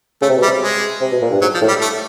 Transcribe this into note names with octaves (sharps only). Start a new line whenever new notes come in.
C#3 A3
C3
B2
G3
C3
G#3
C3
B2
A#2
G2
G#2 F#3
F3
A2
G3
A3